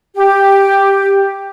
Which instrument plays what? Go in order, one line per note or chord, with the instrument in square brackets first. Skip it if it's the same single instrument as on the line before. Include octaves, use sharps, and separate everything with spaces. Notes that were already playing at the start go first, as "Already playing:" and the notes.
[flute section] G4